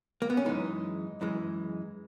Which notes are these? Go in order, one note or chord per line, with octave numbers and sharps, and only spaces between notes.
A#3
B3
C#4
F#2 E3 G#3 D#4
F#2 E3 G#3